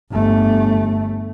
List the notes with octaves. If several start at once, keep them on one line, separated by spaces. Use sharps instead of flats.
G1 A3